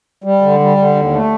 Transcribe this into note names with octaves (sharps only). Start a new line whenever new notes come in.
G3
D3
G3
D3
D#2
A3